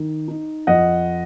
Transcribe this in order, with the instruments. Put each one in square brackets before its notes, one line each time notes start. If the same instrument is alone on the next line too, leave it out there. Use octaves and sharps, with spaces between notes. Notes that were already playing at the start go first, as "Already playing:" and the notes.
Already playing: [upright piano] D#3
D#4
F2 D#5 F#5